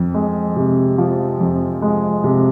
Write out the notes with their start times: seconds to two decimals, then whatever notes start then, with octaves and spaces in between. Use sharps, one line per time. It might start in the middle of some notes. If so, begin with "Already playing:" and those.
Already playing: F2
0.14 G#3
0.56 C3
0.98 F3
1.41 F2
1.82 G#3
2.24 C3